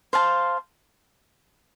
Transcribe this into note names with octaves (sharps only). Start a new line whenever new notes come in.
C5 F5 A5